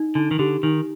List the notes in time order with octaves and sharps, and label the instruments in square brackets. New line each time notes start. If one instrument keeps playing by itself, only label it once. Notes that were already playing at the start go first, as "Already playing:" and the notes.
Already playing: [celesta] D#4
[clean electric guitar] D3 [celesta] D#4
[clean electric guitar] D#3
[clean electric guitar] D3 [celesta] G4
[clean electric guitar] D#3 [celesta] D#4